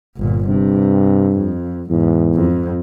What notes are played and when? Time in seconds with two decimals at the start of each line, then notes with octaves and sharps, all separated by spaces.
0.18 G1 A#2
0.48 G2 C3
1.37 F2
1.90 E2 G#2
2.35 F2